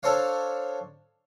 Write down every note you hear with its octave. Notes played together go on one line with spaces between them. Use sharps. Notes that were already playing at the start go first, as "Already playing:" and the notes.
D4 A4 C5 C#5 F5